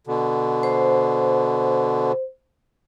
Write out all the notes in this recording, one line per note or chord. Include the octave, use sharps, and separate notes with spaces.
B2 D3
C5